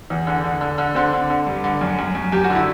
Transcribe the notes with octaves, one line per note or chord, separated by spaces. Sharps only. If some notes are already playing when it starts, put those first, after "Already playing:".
E2
D3
D3
D3
D3
D3 C4
D3
D3
G2
D3
F#2
F#2
F#2
F#2 G4
F#4
D3 E4